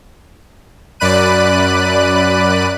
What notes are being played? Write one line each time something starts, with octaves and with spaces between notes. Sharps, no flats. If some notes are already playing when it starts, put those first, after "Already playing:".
F#2 D5 B5 F#6 D#7